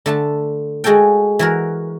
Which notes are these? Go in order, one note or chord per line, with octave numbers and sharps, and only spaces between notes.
D3 A3 A5
G#3 F#4 G#4 A4 G5
E3 F#4 A#4